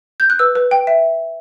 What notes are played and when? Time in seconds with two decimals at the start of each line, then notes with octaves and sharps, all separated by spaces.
0.20 G6
0.30 F#6
0.39 B4 E6
0.55 B4
0.71 G5
0.87 E5